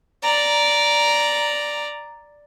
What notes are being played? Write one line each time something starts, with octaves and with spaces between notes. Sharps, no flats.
D5 A#5